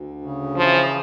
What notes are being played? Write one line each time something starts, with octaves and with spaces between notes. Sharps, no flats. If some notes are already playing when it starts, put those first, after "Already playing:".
Already playing: D2
C#3
E3 F3